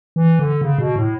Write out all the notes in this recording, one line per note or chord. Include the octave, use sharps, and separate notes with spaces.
E3
D3
C#3
B2
A2